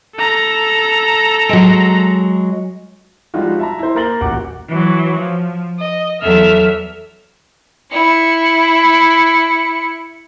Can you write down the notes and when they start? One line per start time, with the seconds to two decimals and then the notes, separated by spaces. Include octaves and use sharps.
0.16 A4 A#5
1.49 F#3 G#3
3.34 F3 G3 G#3 D#4 F4 F#4
3.59 E5 A5 A#5
3.79 E4 C5
3.95 A#3 A#4 A#5 A6 F#7 G7
4.21 D#1 A1 F#4 F#5 D6
4.69 E3 F#3
5.19 F3
5.79 D#5
6.21 E2 F#3 A4 E5 F6
7.92 E4 C#7